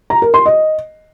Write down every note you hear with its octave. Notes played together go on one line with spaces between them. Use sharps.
A#5
A#4
C6
D#5